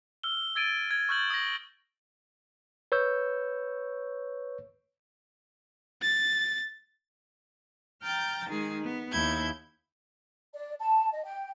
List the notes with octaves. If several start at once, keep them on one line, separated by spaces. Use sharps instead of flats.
E6 F6 G7
E6 G#6 A6 D7 D#7
G#6
C#6 E6 F6 G6 A6 F#7
D#6 A#6
B4 C#5 C#6 E6 G6
A6
G5 A#5 F6 G6 A6
D#3 G#3 D#4 G#4
B3
D#2 E4 G6 G#6
D5
A5
D#5
G5